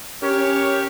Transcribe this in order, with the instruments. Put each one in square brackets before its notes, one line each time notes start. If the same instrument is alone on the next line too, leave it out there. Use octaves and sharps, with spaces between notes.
[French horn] C#4 [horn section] G4 A#4 C#5